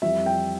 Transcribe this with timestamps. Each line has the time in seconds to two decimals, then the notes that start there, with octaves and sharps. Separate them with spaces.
0.02 F2 E3 G3 E5
0.26 G5